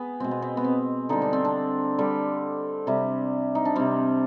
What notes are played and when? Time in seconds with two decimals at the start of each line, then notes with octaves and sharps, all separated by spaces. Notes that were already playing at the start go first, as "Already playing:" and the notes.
Already playing: B3 G#4
0.20 B2 G#3 C4
0.31 B3
0.42 C4
0.57 B3
0.64 C4
1.09 D3 G3 D#4
1.22 D4
1.33 C4
1.45 D4
1.99 D3 G3
2.87 C3 G3
3.55 D#4
3.65 D4
3.76 C3 G3 C4